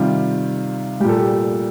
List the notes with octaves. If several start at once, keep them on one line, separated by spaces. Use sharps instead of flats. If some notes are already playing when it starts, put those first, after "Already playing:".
Already playing: C3 D#3 G3 F4
A#2 G3 G4 A4
G4